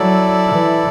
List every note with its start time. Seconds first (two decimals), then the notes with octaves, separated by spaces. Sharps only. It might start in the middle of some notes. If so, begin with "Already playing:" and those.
Already playing: F#3 E4 A4 D5
0.47 E3